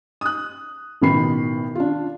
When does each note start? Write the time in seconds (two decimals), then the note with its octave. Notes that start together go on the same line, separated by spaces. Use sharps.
0.21 D#6 F#6
1.02 A1 B2 D#3 B5 C7
1.75 D4 F4